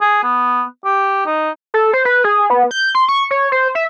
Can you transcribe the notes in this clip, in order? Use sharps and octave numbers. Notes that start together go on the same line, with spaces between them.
G#4
B3
G4
D#4
A4
C5
B4
G#4
B3
G6
C6
C#6
C#5
C5
E5